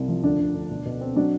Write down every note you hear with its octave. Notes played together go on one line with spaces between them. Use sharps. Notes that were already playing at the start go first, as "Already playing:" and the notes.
Already playing: C2 C3
F3
D2 D4
D2
D2
B2
B2
C4
F#3 D4